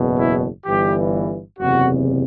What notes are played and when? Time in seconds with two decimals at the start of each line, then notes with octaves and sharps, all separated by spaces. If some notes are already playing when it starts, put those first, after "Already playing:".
Already playing: F#1 E2 B2
0.19 E4
0.65 G1 G2 E3 G4
1.59 F#1 E2 C3 F#4